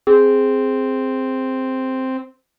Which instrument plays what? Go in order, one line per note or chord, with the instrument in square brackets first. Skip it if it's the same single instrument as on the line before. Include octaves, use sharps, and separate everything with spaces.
[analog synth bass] C4 [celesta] G#4